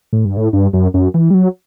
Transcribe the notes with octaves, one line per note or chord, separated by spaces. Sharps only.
A2
G2
A2
G2
F#2
F#2
E3
G3
F#3